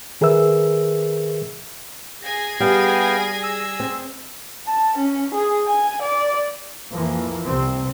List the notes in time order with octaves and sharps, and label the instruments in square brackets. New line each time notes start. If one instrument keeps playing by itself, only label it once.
[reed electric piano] D#3 G#4 A#4 B4 E5 E6
[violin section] G#4 G#5 A#6
[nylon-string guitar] G3 [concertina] B3 F5 G5
[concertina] E6
[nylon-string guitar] C4
[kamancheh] A5
C#4
G#4
G#5
D5
[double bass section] F2 E3 F3 A#3
C2 C3 C4